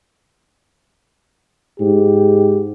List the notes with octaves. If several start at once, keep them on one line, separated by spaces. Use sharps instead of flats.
G#2 G4